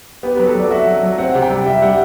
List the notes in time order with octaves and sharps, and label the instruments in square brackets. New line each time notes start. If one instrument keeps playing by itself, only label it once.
[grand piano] B3 [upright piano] G4
[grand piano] F#3 [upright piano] B4
[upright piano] A4
[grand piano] F#3 [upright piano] D5
[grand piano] F#4 [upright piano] E5
[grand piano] F#3
F#3
[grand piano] C4 [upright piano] F#5
[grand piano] C3
[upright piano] G5
[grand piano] G3
[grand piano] G3 [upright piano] E5
[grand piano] G3 [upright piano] F#5